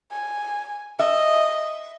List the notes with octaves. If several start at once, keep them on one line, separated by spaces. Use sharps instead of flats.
G#5
D#5 E5